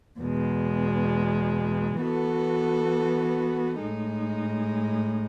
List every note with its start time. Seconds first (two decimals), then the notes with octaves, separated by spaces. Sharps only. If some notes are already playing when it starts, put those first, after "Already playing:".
0.19 E2 B2 G#3
2.00 E3 B3 F#4 A4
3.82 A2 G#3 D#4